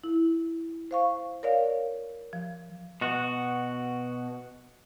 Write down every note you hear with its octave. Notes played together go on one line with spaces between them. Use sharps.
E4
C5 F5 C#6
A#4 C#5 D5 F5
F3
B2 F#4